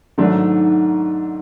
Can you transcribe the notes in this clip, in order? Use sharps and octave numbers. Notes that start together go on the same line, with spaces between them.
G#2 D#3 F#3 A3 D4